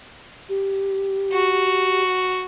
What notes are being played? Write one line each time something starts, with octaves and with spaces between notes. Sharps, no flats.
G4
F#4